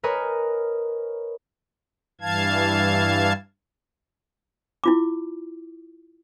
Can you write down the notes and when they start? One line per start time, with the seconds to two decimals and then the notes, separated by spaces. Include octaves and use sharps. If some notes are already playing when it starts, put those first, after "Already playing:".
0.03 A#4 B4 C#5 D#5 G#5
2.21 G2 E3 F5 A5 G#6
4.84 E4 F4 D6